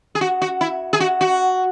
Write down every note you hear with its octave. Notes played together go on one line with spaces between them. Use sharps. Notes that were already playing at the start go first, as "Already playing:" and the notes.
G#4
F#4
F#4
E4
G#4
F#4
F#4